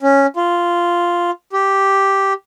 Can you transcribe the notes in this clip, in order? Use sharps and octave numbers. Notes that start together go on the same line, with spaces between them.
C#4
F4
G4